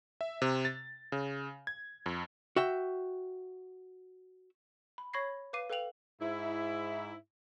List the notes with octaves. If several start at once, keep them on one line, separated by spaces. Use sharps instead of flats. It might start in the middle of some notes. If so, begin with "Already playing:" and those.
E5
C3
A6
C#3
G#6
F2
F#4 E5 G5
B5
C#5 B5 C#6 G#6 A#6 C7
B4 F5 D6 C7 D#7
A4 B4 F5 G5 F7 F#7
G#2 E4